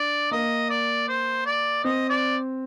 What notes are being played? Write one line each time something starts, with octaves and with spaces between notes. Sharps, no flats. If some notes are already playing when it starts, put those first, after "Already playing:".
Already playing: D4 D5
A#3 D#5
D5
C5
D5
C4 D#5
D5